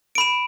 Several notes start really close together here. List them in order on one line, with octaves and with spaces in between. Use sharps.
D7 B5 E7